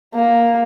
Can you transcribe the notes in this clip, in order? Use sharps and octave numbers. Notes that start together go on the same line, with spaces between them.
A#3